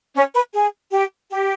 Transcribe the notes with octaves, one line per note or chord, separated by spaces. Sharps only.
C#4 C#5
B4
G#4
G4
G4